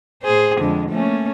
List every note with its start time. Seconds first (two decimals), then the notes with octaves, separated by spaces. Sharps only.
0.23 A2 G#4 C5
0.59 F2 D3 G#3
0.89 A3 A#3 C#4